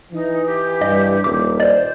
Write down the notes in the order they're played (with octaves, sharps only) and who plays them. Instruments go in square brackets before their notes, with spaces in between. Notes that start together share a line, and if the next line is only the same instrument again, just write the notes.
[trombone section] E3 [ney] D#4
[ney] G4
[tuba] G2 [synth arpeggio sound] D#5
[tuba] D#1 [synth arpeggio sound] D6 B6
[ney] C5 [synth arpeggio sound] D5 D#5